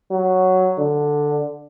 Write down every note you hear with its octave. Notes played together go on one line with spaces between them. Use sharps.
F#3
D3